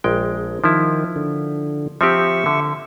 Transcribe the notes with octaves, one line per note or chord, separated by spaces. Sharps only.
A#1 G#3 G5
D#3 F3 E4
D3
F3 C4 G4 E5 C#6
D3